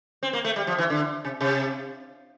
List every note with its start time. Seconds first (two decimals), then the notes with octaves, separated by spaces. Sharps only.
0.23 C4
0.33 A#3
0.45 A3
0.56 G3
0.67 F3
0.79 E3
0.90 D3
1.25 C3
1.41 C3